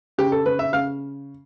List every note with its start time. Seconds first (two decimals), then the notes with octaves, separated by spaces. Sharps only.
0.18 C#3 G4
0.32 A4
0.45 C#3 B4
0.59 E5
0.72 C#3 F5